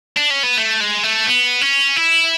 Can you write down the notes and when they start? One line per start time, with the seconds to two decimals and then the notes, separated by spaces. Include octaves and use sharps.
0.17 D4
0.30 C#4
0.43 B3
0.57 A3
0.81 G#3
1.03 A3
1.27 B3
1.61 C#4
1.96 E4